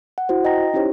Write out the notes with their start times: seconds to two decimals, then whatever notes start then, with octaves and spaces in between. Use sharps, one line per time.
0.18 F#5
0.29 E4 F#4 C5
0.45 D#5 G5 A#5 A#6
0.74 C#4 D#4 E4 G4 C5 C#5